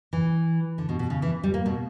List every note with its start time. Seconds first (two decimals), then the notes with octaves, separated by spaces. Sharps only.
0.13 E3
0.78 D3
0.89 B2
0.99 B2
1.10 C#3
1.22 E3
1.43 G3
1.54 A#3
1.66 B2